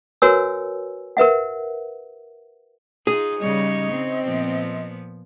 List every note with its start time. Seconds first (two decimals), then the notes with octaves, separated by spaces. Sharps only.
0.22 F#4 A#4 B4 C#5 G#5 E6
1.17 A#4 B4 E5 F#5
3.07 D#4 F4 G#4
3.40 C#3 G3 D#4 C#5 D#5
3.91 C4
4.24 A#2 F3 B3